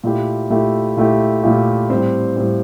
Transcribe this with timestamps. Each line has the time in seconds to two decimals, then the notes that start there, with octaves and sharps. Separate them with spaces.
0.04 A#2 A3 E4 G4
0.50 A#2 A3 E4 G4
0.97 A#2 A3 E4 G4
1.43 A#2 A3 E4 G4
1.90 A2 G3 C4
2.37 A2 G3 C4